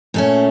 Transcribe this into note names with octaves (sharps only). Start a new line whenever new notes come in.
A#2 A3 C#4